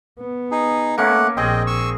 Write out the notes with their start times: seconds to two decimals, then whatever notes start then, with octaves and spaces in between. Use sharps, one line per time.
0.20 B3
0.51 D#4 G#4
0.98 A3 A#3 C#4 F#5
1.37 A#1 C4 G#4 D#5 G5
1.67 C#6 E6